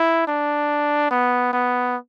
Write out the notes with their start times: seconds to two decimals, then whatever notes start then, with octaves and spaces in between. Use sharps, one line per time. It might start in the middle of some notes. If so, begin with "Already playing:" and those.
Already playing: E4
0.27 D4
1.11 B3
1.53 B3